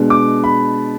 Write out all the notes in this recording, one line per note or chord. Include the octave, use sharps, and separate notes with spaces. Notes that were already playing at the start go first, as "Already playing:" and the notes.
Already playing: B2 G#3 D4
D6
B5